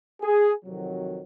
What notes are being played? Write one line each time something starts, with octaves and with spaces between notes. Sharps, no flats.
G#4
F2 C3 D#3 F#3